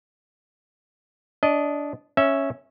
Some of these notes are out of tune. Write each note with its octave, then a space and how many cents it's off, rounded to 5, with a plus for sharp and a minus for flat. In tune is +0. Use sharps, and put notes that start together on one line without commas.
D4 -20 D#5 +0
C#4 -5 E5 +0